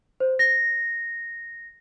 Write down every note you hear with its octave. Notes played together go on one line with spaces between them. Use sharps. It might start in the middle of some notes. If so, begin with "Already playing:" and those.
C5
A#6